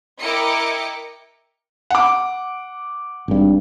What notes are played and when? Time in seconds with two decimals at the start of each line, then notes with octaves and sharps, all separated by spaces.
0.21 E4 A#4 D#5 G5 D6 C#7
1.90 F#5 D6
3.28 G#1 G2